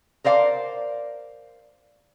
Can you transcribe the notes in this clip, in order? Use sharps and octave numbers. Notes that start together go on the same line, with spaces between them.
A#4 C5 D5 F5